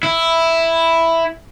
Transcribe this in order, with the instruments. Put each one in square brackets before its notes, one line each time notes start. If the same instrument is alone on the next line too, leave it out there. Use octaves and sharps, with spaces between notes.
[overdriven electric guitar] E4